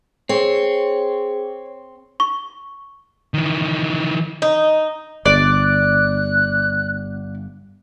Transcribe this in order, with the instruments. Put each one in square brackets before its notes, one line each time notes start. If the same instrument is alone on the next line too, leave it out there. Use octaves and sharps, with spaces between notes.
[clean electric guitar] C4 [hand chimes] G#4 [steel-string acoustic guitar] C#5
[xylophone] C#6
[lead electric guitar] D#3 E3
[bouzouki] D#4
[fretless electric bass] G1 [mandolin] D5 [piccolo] F#6